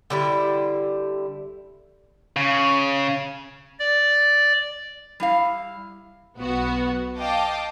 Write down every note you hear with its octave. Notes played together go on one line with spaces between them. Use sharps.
D3 G3 E4
C#3
D5
G3 E4 F5
B1 B3 F#4
D#5 F5 G5 A5 D6